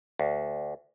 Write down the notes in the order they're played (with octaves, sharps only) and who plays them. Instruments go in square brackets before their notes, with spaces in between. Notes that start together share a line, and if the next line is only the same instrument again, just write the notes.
[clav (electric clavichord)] D2